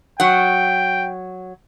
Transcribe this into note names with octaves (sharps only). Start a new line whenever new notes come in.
F#3 F#5 G5